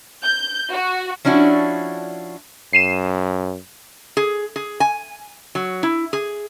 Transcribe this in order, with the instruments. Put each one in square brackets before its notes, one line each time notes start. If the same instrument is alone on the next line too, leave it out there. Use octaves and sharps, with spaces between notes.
[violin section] G6
F#4
[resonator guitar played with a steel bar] F3 C#4 D4 E4 F#4
[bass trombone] F#2 [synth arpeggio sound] C7 D#7 E7
[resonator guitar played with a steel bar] G#4
G#4
G#5
F#3
E4
G#4